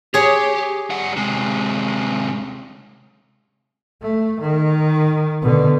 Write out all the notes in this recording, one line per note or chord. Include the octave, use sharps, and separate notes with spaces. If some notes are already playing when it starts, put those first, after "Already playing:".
G4 G#4 C#5
G3 F#5
C3 G#3
A3
D#3
B2 D3